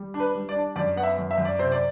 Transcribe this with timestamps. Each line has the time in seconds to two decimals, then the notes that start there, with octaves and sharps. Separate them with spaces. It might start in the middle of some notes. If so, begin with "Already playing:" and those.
Already playing: G3
0.14 D4
0.20 B4
0.35 G3
0.49 D5
0.55 D4
0.76 F#2 D5
0.96 B3 F#5
1.03 E5
1.18 F#2
1.31 E5
1.38 F#2
1.45 D5
1.59 C3 C5
1.72 D5